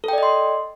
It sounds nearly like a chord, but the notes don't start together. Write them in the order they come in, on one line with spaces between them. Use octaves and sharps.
A4 G5 D5 D#5 C6